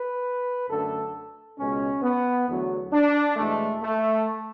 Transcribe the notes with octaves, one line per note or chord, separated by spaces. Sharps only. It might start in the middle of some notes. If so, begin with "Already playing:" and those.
Already playing: B4
F#2 D3 A3 A4
C#2 B2 G#3 C#4
B3
E2 D3 F#3 A3
D4
E2 B2 G#3 A3
A3